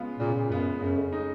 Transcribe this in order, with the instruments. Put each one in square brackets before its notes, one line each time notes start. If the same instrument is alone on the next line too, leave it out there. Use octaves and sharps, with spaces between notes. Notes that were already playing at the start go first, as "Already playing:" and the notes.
Already playing: [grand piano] C#3 G#3 B3 F4
[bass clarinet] A#2 [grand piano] C#3
[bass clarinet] A#2
[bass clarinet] F#2 [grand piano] G#3 B3 F4
[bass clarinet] F#2 [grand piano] C#3
[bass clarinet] F2
[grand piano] G#3 D#4